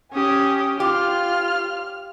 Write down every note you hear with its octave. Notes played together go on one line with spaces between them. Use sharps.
C#4 G4 G#5 D#6
F4 G4 F5 F6